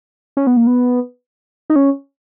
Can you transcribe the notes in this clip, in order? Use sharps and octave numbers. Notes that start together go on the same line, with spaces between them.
C#4
B3
A#3
B3
D#4
C#4